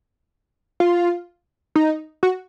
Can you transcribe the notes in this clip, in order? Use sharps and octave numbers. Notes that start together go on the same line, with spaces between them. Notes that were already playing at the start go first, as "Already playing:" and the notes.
F4
D#4
F#4